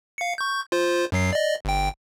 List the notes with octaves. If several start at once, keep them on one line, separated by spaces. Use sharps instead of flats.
F5 C#7
C#6 G6
F4 C5
F#2 F#3 C7
D5 D#5
G1 G5